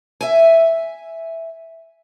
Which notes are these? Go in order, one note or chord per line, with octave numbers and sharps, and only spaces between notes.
E5 G#5